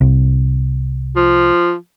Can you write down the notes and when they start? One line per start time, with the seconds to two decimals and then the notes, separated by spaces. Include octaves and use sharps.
0.01 C2
1.16 F3